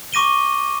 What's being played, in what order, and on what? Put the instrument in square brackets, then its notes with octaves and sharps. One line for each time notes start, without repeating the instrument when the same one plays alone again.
[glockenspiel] C#6 D6 A#6 D#7 G7